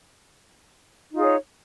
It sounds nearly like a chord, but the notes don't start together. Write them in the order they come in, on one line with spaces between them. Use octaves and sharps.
D#4 F4 G#4 C#5